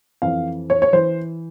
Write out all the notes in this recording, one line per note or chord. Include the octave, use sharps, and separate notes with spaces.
F2 E3 F5
C#5
C#5
E3 C5